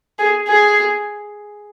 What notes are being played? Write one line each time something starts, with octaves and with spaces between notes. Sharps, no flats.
G#4
G#4